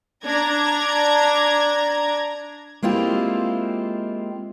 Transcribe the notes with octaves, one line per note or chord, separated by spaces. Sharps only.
D4 A#5 G#6
G#3 A#3 C4 E4 F4 G4